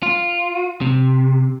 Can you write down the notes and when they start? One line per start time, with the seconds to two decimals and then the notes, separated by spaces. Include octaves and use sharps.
0.03 F4
0.81 C3